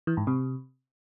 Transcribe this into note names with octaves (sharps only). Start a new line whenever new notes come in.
E3
G#2
C3